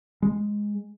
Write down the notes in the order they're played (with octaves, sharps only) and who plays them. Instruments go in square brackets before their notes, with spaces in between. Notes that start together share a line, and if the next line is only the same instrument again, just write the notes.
[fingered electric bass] G#3